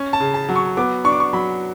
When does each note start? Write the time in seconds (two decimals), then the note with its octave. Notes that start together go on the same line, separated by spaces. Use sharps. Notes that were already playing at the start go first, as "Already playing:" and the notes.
Already playing: C#4
0.13 A5
0.20 C#3
0.34 A5
0.49 F#3
0.56 C#6
0.77 B3 D6
1.04 D4 C#6
1.12 D6
1.20 C#6
1.33 F#3 B5